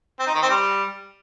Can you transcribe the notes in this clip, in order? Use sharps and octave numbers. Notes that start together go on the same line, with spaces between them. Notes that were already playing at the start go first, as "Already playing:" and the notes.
C4
D#4
D#3
C4
G3